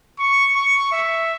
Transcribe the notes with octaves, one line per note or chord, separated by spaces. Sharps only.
C#6
C#6
E5